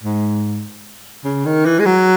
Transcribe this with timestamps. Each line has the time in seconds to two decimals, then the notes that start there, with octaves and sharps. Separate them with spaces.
0.04 G#2
1.25 C#3
1.46 D#3
1.65 E3
1.79 G#3
1.86 F#3